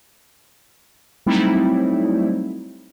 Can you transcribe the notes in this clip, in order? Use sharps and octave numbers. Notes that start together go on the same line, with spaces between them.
F#3 G3 A3 C4 D#4 E4